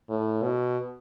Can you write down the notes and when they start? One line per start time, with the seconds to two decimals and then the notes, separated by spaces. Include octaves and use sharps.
0.09 A2
0.42 B2